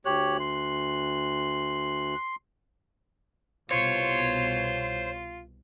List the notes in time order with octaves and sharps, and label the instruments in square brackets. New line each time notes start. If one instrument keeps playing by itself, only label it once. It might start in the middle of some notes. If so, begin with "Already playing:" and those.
[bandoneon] D2 F#6 [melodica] G4 C#5
[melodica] C6
[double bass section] C2 B2 [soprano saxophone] F4 [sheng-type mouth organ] C5 C6 [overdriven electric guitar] C#5